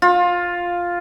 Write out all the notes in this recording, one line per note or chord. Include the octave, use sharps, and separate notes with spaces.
F4